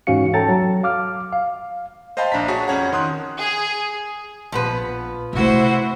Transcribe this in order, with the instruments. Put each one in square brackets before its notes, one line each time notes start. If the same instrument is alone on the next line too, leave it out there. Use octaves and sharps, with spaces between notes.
[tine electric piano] G#2 E3 C#4 F#4 F5 C#7
A4 C#5 G5 A5 A#5 A6
F#3
F5 D6 F6
F5
[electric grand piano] C5 D#5 F5 G5 A5 B5
A#1 D4 E5 A#5 B6
F#4 G#4 C#5 A5
F2 C#4 C#5 F#5 A#5
D#3 C6 D#6 F#6
[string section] G#4
[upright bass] A#1 [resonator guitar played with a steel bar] F3 B3 B4
[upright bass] C3 A3 [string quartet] E4 F#4 C5